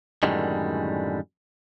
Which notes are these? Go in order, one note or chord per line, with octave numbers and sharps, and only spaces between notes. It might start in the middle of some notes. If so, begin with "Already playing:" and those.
F#2 A2 D3 D#3 G3 G#3